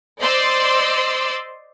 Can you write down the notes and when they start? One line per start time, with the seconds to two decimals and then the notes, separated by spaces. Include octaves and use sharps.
0.21 C5 D5 D#5 C6 D6 E6